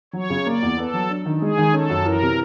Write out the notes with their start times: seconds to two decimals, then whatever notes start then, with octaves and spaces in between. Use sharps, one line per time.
0.13 F#3 C#5
0.30 C#3
0.46 A#3 D5
0.62 E2
0.77 B3 A4
0.94 F#3
1.10 D4
1.26 D#3
1.41 G#3 G#4
1.58 D#3
1.73 C#4 A4
1.90 F#2
2.05 E3 A#4
2.22 C3